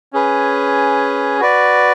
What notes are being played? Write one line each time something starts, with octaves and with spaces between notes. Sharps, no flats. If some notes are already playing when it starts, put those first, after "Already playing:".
C#4 G#4 B4
F#4 B4 D5